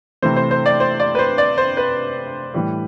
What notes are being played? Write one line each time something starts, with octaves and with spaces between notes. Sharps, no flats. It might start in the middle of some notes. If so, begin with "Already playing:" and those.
C3 E3 A3 C5
C5
C5
D5
C5
D5
B4
C5
D5
C5
B4
A2 E3 G3